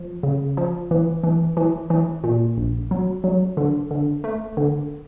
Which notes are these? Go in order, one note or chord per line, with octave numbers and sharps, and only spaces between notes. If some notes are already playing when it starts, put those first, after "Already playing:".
Already playing: F3
C#3
F3
E3
E3
E3
E3
A#2
A#1
F#3
F#3
D3
D3
A3
D3